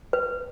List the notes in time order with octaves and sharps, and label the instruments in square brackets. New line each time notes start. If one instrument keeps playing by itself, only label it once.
[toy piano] B4